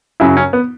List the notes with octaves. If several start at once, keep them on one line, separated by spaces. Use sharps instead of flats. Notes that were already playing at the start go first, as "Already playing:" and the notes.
F#2 C#3 F#3 E4
C#4
B3